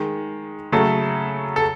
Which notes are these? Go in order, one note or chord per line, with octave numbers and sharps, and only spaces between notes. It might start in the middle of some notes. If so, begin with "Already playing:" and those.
Already playing: D#3 G#3
C#3 F#3 A3 A4
A4